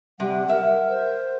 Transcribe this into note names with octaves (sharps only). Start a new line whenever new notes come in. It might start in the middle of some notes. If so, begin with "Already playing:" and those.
C3 G3 F#5
A#4 E5
C5